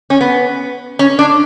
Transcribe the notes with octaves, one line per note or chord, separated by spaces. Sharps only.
C#4
B3
C#4
D4